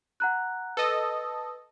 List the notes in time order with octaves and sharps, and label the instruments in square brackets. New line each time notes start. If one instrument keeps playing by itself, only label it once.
[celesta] F#5 A#5 F#6
[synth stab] A4 D#5 [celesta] B4 D#6